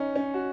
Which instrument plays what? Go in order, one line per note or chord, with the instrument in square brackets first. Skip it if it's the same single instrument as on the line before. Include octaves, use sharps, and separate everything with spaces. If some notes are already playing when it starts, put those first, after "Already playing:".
Already playing: [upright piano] C#4 D#4
C#4
F#4